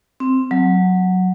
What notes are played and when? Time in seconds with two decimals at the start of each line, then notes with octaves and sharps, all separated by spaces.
0.20 C4
0.51 F#3